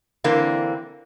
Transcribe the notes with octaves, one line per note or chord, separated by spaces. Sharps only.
D3 E3 A#3 C4